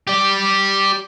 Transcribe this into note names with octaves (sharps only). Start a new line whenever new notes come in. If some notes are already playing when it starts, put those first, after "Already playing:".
G4 D5